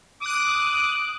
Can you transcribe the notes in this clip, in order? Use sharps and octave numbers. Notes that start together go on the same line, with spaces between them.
D6 D#6 F#6